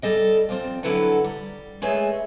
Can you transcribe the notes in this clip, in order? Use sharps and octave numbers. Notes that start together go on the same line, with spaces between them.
G3 A4 D#5 G5
F3 G3 C4
D3 F#3 E4 A4 B4 F#5
G3
G#3 A3 G#4 B4 C#5 E5